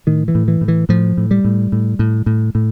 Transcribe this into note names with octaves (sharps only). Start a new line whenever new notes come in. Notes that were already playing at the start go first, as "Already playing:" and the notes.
A2 D#3
E3
A2
E3
A2
E3
A2 F3
A2
G3
A2
A2
A2
A2
A2